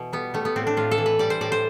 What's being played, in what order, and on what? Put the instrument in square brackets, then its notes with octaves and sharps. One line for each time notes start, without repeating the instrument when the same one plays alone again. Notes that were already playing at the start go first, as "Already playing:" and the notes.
Already playing: [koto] B2 E3
G3 B3
G3 A3
B3
A2 C4
D4
A2 F4
A4
E3
B4
G3 D5
C5
A2 D5
C5